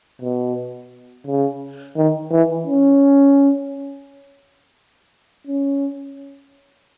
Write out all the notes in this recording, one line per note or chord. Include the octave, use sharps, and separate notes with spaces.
B2
C#3
D#3
E3
C#4
C#4